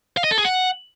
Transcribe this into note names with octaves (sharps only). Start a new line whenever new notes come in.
F5
D#5
A4
G#4
F#5